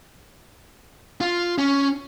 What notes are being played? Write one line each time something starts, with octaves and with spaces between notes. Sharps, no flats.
F4
C#4